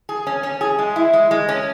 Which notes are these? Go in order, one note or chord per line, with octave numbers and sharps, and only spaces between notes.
G#4
C#4
C#4
G#4
G#3
E4
G#3
G#3
C#4